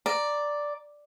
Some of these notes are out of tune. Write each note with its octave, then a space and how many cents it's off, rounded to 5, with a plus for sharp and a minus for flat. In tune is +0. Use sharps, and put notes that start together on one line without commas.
D5 +0 A#5 +0